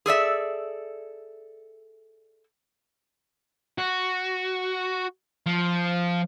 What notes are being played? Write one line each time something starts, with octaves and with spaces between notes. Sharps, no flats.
G#4 A4 D5 E5
F#4
F3